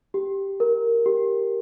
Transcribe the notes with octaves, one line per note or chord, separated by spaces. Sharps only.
G4
A#4
G4